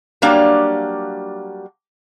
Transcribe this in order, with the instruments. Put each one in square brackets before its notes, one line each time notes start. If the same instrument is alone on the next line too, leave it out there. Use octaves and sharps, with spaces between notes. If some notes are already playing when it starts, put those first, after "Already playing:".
[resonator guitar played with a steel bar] F#3 G3 A#3 D4 F5